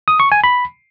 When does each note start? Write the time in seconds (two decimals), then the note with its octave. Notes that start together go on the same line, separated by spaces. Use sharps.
0.08 D#6
0.20 C#6
0.32 G#5
0.44 B5